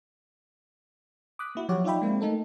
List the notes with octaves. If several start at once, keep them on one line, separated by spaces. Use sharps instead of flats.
D6 D#6 F#6 B6
A#3 E4 F#4
F3 F#3 G4 C#5 F#5 D6
D#4 F4 D5 E5 G5 B5
G#3 A#3 C4
A3 D#4 A4 A#4